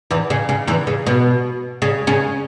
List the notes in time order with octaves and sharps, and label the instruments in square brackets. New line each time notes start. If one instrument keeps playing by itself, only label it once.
[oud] E2 E3
C#3
C#3
E2 E3
C#3
B2
C#3
C#3 C#4